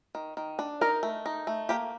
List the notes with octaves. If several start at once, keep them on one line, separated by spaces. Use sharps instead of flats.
D#3
D#3
D4
D#4 A#4
A3
D#4
A3
A#3 G4